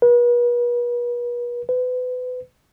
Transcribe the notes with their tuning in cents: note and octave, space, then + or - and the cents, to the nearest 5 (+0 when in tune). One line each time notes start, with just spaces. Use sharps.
B4 -40
B4 +30